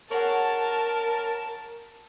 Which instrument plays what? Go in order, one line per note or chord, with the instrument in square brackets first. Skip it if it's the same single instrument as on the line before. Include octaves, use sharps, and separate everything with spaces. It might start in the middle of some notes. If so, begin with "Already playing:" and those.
[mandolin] F#4 G#4 C#5 [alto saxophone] A#4 [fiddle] A5